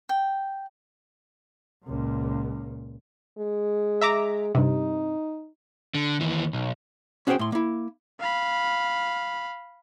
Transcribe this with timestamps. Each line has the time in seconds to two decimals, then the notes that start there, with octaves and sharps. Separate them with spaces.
0.09 G5
1.85 C#2 A#2
3.38 G#3
4.01 E5 A#5 D6
4.55 G2 C3 D#4
5.95 D3
6.21 D#2 E3
6.53 B1
7.27 C#4 F#4 G#4 B4 C5 G5
7.39 A2 C6
7.52 A#3 E4
8.20 F5 B5